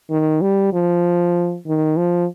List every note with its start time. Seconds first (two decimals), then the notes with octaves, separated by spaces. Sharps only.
0.10 D#3
0.41 G3
0.73 F3
1.67 D#3
1.97 F3